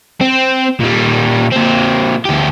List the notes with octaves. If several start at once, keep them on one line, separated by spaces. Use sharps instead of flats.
C4
A#2 G3
A#2 C4
D2 G4